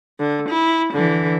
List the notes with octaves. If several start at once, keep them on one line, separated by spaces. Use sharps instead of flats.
D3
E4
D3 E3